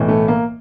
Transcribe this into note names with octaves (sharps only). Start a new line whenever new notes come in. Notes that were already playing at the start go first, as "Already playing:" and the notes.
Already playing: B1 A2 E3
A3
A#3